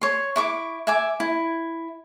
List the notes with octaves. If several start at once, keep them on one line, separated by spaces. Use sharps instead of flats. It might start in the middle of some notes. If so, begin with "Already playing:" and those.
C#5 C6
E4 C#6 D6
E5 G#5 D6
E4